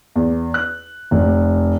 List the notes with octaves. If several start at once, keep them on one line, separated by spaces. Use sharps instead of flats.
E2
F#6
F1